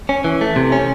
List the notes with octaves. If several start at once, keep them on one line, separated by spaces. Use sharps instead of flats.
C#4
E3
A3
C3
C#4